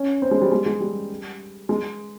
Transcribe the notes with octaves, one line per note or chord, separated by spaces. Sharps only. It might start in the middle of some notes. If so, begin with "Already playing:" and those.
Already playing: C#4
C4
G#3
G3
G#3
G#3
G3
G#3